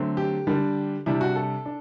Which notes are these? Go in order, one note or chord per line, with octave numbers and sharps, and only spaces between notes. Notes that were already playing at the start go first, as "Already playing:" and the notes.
Already playing: D3 F#3 A3 C4
G4
D3 G3 D4
C3 G3 D4 E4
F#4
A4
D4